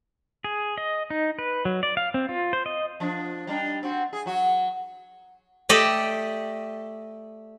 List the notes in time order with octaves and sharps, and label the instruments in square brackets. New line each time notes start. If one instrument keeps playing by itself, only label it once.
[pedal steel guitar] G#4
D#5
D#4
B4
F#3
D5
F5
C4
F4
C5
D#5
[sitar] F3 D4
G3 D4 D#4
C4 F#4
G#4
F#3 F#4
[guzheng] A3 G4 D5 D#5